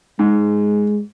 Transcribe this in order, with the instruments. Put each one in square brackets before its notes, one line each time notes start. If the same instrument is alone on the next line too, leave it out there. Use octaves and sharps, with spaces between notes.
[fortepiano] G#2 [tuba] G#3